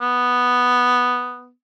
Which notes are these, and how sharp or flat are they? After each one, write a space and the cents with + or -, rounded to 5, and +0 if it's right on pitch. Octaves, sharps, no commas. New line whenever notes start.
B3 +0